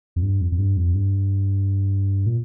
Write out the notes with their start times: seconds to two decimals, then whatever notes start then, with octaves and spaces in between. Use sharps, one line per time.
0.16 F2
0.22 G2
0.41 F2
0.52 F2
0.59 G2
0.77 F2
0.95 G2
2.26 A#2